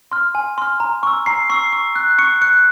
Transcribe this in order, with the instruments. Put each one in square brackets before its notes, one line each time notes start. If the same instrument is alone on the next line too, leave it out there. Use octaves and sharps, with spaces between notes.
[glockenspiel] C6 F6
G#5
C6 F6
A#5
C#6 E6
A#5 C7
C#6 E6 C7
C#6
F#6
C#6 C#7
F#6 C#7